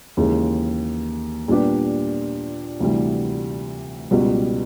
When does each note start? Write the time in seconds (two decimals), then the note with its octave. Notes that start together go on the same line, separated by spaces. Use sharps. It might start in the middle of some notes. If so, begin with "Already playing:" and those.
0.17 D#2 C#3 E3 G#3
1.48 A#2 G3 B3 D4 G4
2.80 D2 C3 E3 G3
4.11 C#2 B2 G3